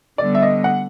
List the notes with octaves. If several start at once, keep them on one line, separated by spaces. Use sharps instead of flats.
D3 G3 B3 D5
E5
D#5
F#5